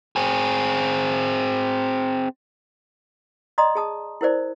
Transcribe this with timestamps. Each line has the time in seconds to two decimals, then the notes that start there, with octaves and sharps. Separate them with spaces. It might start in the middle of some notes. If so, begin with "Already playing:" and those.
0.16 C4 G#4
3.58 D5 D#5 A#5 C6 D#6
3.75 G#4 A5 D#6
4.21 E4 A#4 C5 D5